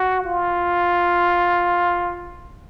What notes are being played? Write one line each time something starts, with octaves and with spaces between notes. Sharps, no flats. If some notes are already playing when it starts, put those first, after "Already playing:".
Already playing: F#4
F4